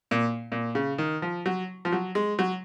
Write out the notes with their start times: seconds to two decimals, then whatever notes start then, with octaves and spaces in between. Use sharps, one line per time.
0.11 A#2
0.52 A#2
0.75 C#3
0.98 D#3
1.22 F3
1.46 F#3
1.85 F3
1.92 F#3
2.15 G#3
2.39 F#3